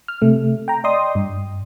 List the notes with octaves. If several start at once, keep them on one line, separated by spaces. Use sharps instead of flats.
F6
C3 A3
G5 A#5
D5 D#5 G5 C6 D#6
G2